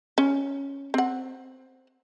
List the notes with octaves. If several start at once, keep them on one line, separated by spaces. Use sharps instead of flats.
C#4
C4 F#5